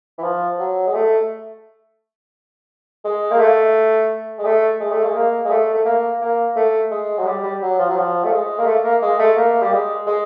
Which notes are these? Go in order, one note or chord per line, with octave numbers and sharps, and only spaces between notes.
E3
F3
F#3
G#3
A3
G#3
A#3
A3
G#3
A3
G#3
A3
G#3
A#3
G#3
A3
A3
A#3
A#3
A3
G#3
F#3
G3
G3
F#3
F3
F#3
F3
A3
G#3
A#3
A3
A#3
G#3
A3
A#3
G3
G#3
G#3